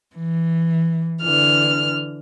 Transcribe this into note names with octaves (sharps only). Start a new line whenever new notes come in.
E3
D3 E3 F6